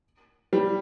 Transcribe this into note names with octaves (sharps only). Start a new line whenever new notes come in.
G3